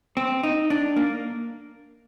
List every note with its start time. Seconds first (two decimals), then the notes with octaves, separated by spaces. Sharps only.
0.17 C4
0.43 D#4
0.70 D4
0.96 A#3